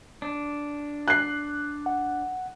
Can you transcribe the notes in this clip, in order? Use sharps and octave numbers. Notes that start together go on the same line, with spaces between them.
D4
F#6 C7
F#5